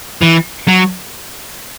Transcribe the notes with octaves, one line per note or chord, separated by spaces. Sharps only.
E3
F#3